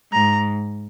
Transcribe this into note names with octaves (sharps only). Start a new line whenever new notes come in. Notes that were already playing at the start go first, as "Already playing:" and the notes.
G#2 A#5